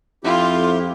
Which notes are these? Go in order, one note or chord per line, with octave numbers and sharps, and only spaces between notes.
F2 E4 F4 G4